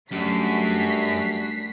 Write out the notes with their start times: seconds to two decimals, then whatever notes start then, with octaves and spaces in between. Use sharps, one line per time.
0.11 F#2 G3 A3 D4 F#4 B6 C7